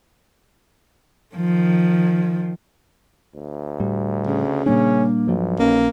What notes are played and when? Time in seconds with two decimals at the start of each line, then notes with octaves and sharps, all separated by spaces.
1.35 D#3 F3
3.35 D2
3.80 A2 G3
4.26 C#3
4.66 A#2 G3 A#3 C#4 D4
5.27 B1 G2 F3 F#3
5.59 A#1 A#3 C#4